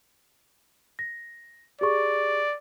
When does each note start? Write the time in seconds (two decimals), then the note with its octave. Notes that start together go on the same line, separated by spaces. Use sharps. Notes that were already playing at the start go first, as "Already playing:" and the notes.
0.99 A#6
1.81 G4 G#4 D5 C#6